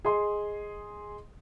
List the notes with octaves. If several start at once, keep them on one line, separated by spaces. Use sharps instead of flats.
G#4 D#5 C6